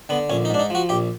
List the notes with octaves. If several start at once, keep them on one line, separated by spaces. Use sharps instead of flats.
D3 B3
A#1 C#4
D#4
G#2 D4
D#4
F3 F#4
A#1 G4